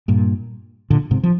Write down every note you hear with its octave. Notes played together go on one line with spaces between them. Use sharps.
G2 A#2
A#2 D3
G#2 C3
F3